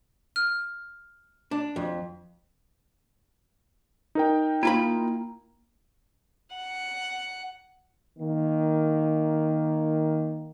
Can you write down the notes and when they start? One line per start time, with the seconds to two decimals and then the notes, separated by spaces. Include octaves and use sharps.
0.36 F6
1.51 D4
1.76 F2
4.15 D#4 A#4 G5
4.63 A#3 E4 F4 B5
6.56 F#5
8.19 D#3 A#3